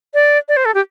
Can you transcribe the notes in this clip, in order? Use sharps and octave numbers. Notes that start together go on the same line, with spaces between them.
D5
D5
C5
A4
G4